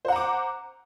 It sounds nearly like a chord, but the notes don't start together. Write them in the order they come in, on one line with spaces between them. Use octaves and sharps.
C5 F#5 A#5 D6